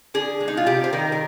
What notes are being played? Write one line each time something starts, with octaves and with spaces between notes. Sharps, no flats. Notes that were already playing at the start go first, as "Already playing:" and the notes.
D3 G#4
G#3
D#4
F4
C3 G4
C5
D#3 G3 A#4
A#4